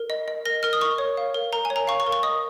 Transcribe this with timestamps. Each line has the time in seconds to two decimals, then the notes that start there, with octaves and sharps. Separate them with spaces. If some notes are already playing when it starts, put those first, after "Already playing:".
Already playing: A#4
0.10 D#5
0.28 D#5
0.45 A#4 A#6
0.63 A#4 F6
0.73 D#6
0.81 A#4 C#6
0.98 C#5
1.17 F5
1.34 A#4
1.53 A#4 A#5
1.65 G#5
1.70 C#5
1.76 A#5
1.87 F5 C#6
2.00 C#6
2.07 A#4
2.12 C#6
2.23 D#5 D#6